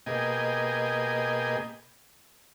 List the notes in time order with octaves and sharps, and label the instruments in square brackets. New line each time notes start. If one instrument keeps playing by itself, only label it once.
[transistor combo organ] B2 A#3 G4 G#4 D#5